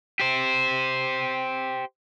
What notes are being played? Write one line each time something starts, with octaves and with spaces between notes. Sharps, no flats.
G4 C5